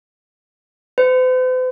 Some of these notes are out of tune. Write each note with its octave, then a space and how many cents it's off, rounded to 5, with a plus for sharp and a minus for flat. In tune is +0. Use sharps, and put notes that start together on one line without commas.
C5 -45